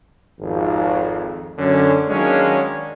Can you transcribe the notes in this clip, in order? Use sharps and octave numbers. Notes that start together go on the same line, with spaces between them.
G#1 F2
F#2 D3 C#4
D#3 F#3 G#3 A#3 C#4 D4